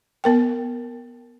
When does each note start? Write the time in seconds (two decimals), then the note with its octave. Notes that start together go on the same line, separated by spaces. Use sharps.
0.24 B3 A#4 G5